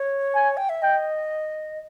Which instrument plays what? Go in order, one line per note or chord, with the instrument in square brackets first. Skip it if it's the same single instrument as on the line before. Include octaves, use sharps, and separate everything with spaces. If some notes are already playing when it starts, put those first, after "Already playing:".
Already playing: [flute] C#5
[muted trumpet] G#5
[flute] G5
E5
[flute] D#5 [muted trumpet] G5